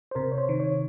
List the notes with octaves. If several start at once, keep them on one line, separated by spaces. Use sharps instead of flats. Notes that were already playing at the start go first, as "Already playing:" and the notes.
C5
C3 A#4
C#5
C5
D#3
C#5